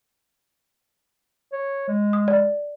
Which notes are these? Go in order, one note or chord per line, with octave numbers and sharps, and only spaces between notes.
C#5
G#3
D#6
D5